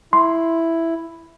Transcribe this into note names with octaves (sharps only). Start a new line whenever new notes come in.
E4 C6